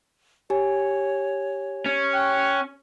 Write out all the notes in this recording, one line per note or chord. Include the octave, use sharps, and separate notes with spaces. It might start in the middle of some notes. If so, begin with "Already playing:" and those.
G4 C#5 G#5
C#4
G5 F#6